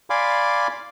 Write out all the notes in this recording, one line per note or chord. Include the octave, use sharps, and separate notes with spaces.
D5 F5 G#5 B5 C6 D6